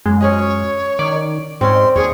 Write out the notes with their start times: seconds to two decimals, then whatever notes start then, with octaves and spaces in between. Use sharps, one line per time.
0.06 F#2 G#3
0.20 C#4 G#4 C#5 D#5
0.99 D#3 D5
1.61 G#2 C4 C#4 C6
1.96 D#2 G#4 C#5